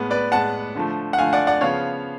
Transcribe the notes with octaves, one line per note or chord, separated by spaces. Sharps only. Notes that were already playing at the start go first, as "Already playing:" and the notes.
Already playing: A2 G#3 B3
B4 D5
A2 G#3 B3 F#5 A5
D3 F3 A3
F#5
D3 F3 A3 F5 G#5
D5 F#5
D5 F#5
C#3 F3 B3 C#5 F5